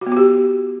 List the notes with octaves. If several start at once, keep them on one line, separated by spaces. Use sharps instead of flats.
F#4
B3
F#4
G4